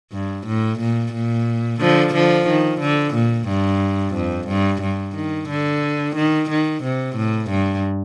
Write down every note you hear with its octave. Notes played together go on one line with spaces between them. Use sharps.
G2
A2
A#2
A#2
D3 F3
D3 F3
D#3
D3
A#2
G2
F2
G2
G2
D#3
D3
D#3
D#3
C3
A2
G2